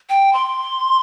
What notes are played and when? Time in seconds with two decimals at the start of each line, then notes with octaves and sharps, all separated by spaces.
0.10 G5
0.33 C6